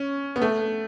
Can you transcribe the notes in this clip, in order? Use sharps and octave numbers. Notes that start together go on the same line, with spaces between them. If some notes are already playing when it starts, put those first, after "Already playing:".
Already playing: C#4
B3
A3